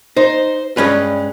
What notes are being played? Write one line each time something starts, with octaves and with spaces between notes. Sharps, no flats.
D#4 C5
G2 G#3 C#4 B4